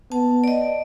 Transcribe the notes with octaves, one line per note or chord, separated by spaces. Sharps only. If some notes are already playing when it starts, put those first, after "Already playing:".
B3 A5
D5 D#5